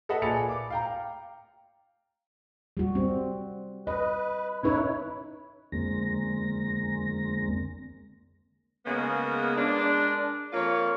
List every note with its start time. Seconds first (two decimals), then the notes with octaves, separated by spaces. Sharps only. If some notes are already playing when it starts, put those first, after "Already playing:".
0.09 A4 B4 D#5 E5 F#5 A5
0.22 A#2 G#4 B5 A6 C#7 F7
0.49 D6
0.70 F5 G5 A#5
2.77 G3 F#4
2.95 C4
3.87 B4 D#5
4.63 C#4 D#4 E4 B4 C#5
5.72 F2 D3 G#3 A#3 C4 A#6
8.86 C#3 G#3 A#3 B3
9.55 G#3 A#3 D4
10.53 F2 A#3 F4 C#5